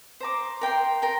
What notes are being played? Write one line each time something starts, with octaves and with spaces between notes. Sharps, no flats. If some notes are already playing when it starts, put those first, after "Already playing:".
C5 A#5 D6
A#4 G5 C6
A#4 G5 C6